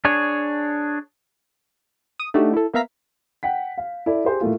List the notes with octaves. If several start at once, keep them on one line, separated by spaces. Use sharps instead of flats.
D4 G#4 C#5
D#6
A3 D4 D#4 F#4 G4
E4 A4
A#3 B3 E5 F5 A#5 B6
F#5 G5 B6
F5
E4 A4 D5
G4 G#4 C5
A2 A3 A#3 F4